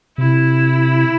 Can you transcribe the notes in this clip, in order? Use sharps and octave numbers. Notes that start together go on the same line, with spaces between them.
C3 E4